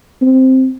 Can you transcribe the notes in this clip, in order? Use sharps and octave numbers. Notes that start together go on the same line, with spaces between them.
C4